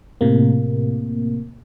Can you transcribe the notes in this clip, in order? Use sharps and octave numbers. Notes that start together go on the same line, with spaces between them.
A2 C3 A#3